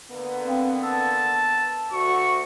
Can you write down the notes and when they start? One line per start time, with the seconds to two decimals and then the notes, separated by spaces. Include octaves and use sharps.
0.11 D3 A#3 B3
0.45 C4 F5 G5
0.83 A5 E6
1.92 D2 F#4 C#6